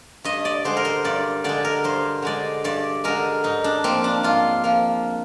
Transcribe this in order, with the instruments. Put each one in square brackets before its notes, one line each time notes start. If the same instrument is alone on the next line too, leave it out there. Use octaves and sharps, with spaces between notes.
[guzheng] G2 D#5
D5
D3 G#3 C5
A#4
C5
G2 D5
D3 G#3 D5
A#4
G2 C5
D3 G#3 D5
G2 D5
D3 G#3 A#4
G#2 D#4
D4
F3 A#3 C4
D4
G#2 F4
F3 A#3